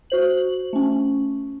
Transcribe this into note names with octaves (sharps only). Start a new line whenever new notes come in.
F#4 C5 F#7
A3 C#4